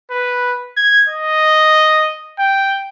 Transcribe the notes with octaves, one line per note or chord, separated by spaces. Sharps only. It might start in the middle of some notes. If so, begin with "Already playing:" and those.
B4
G#6
D#5
G5